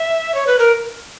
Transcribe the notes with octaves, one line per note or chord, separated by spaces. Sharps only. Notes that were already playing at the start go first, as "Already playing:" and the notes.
Already playing: E5
C#5
B4
A#4